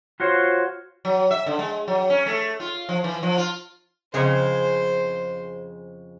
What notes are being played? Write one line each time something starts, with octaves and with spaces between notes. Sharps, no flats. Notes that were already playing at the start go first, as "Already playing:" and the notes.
F4 F#4 C5 C#5
F#3
E5
D3
G#3
F#3
C#4
A3
F4
F3
E3
F3
F4
F2 C#3 G#3 C5